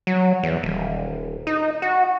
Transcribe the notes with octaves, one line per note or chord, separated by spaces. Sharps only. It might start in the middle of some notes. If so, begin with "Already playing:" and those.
F#3
E2
D#1
D#4
F#4